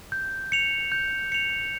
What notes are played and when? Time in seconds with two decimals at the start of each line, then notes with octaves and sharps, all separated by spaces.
0.12 G6
0.52 C#7 F7
0.92 G6
1.32 C#7 F7